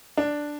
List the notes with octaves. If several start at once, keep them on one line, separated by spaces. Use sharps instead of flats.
D4